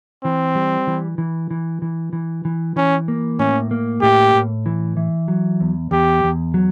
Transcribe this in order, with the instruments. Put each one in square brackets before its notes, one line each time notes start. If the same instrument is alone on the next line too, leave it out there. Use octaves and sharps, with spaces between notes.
[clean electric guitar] E3 [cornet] C4
[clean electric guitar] G3
E3
E3
E3
E3
E3
E3
[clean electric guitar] E3 [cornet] C#4
[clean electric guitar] A#3
[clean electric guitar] A2 [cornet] C#4
[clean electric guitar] A#3
[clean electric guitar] A2 [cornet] G4
[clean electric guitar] A2
E3
E3
F#3
E2
[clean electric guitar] E2 [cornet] G4
[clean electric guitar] E2
F#3